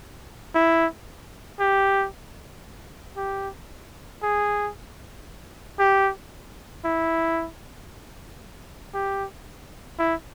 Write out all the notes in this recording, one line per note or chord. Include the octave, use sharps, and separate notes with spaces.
E4
G4
G4
G#4
G4
E4
G4
E4